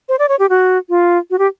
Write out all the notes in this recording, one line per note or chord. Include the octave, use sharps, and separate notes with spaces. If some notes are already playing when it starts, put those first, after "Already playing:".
C5
D5
C#5
G4
F#4
F4
F#4
G4